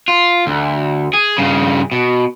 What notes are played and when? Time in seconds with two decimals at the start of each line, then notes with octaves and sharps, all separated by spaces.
0.08 F4
0.47 D2
1.13 G#4
1.38 G2 C#3
1.92 B2